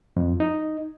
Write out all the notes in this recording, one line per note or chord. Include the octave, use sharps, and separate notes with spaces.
F2
D#4